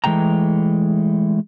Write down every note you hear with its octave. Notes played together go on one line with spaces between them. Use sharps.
E3 G#3 A3 G5 A#5